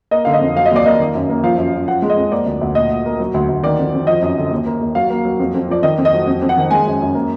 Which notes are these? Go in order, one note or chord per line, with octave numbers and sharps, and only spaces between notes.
A#3 D#5
D3 F5
D#5
F2
F#3 F5
D#5
D#2 D5
A#3 D#5
D#3
F#2
A#3
F3 F5
F#2
F#2
F3 F#5
G#3
D#5
F2
A#3 D5
D2
D2
A#2 D#5
A#2
A#3
F#3
D2
D2
D#3 D5
F2
F2
F3 D#5
F#2
D3
D#2
A#3
D#2
F#3 F5
A#3
F#3
F2
F2
F3 D5
D#3 D#5
F2
D#5
F#3
F2
F2
F#5
D#3
G#3 G#5
F#2
F#2
A#3